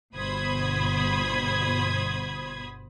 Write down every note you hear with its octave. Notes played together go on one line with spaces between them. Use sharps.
G1 B2 C5 B5 D#6 G#6